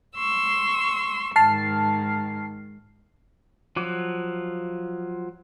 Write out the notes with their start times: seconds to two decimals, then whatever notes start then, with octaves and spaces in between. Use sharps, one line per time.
0.16 C6 C#6 E6
1.36 G#2 D#3 A5 F6 C7
3.76 F3 F#3 D6